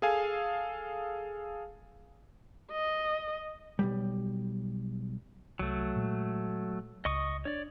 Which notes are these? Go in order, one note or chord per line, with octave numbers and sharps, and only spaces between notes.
G#4 A4 F5 G#5
D#5
B1 G2 G3
C2 F#3 A3
A#2 G#3
C#2 D#5 C#6 D#6
D4 C#5 D5